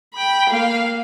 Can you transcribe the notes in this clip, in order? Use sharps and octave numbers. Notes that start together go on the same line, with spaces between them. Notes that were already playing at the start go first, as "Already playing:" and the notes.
G5 B5
A#3 F5